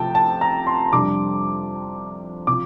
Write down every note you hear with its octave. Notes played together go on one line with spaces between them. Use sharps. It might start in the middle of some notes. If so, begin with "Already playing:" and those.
Already playing: C3 F3 A3 G5 A5
A5
A#5
C6
F2 C3 G3 D4 D6
C3 F3 D6